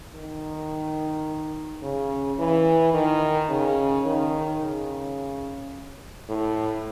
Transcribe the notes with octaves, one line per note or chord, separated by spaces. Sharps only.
D#3
C#3
E3
D#3
C#3
D#3
C#3
A2